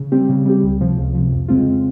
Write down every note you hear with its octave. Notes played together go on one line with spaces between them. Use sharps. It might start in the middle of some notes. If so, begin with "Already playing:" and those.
Already playing: C#3
G3 C4 G4
C#3
G3 C4 G4
C#2
C3 F3
C#2
C3 F3
F2
C#3 G#3 C4 F4
F2